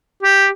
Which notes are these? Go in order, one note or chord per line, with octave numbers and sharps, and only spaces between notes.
G4